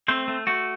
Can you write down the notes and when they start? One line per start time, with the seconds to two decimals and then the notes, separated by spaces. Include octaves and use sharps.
0.08 A3 C4 C5
0.28 A3
0.47 A3 F#4